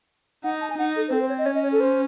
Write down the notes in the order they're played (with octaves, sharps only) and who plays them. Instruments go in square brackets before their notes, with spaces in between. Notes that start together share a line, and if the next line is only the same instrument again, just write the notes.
[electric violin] D#4 [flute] F#5
[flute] A5
G#5
[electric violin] D#4 [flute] F#5
[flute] A4
C5
[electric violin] C4 [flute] A4
[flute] C5
C#5
D#5
[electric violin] C#4 [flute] C#5
[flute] D#5
C#5
A4
C5